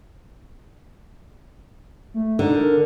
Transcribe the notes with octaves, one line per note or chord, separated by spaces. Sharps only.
A3
D3 D#4
A#4